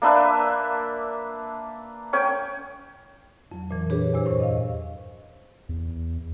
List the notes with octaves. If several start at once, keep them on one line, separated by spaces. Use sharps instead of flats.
A#3 D4 B4 E5
C#4 C#5 G5
F2 F#3
A#2 E3
D4 G4 G#4 B4 C#5
E2 A#2 C5 E6
G2 C5 C#6
D#5 F5
E2